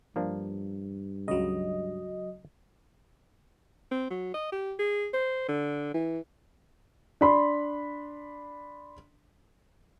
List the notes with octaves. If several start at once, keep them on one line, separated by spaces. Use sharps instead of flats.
G2 F3 A#3 D4
C#2 C#3 F#3 D#5
C4
F#3
D#5
G4
G#4
C5
D3
E3
D4 B5 C6